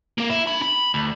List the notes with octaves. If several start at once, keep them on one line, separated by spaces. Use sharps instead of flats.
A#3 A#4
E4
D4 B5
B5
D2